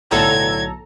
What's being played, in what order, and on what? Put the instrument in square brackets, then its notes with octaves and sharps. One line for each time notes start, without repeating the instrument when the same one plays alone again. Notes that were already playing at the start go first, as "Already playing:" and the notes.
[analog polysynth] B1 A4 A#5 [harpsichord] A2 D3 [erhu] G#6